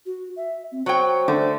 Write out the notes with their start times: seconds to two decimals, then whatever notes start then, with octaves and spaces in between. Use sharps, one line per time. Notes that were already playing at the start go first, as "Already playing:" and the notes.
0.06 F#4
0.36 E5
0.72 C4
0.86 F#3 C5 G5
1.28 D3 A3